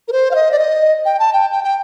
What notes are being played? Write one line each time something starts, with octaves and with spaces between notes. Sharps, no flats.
A#4
C5
F5
D#5
D5
D#5
G5
A5
G5
G5
G5